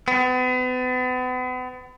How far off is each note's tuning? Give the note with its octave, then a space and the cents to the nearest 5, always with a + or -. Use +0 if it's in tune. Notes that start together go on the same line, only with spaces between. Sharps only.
B3 +40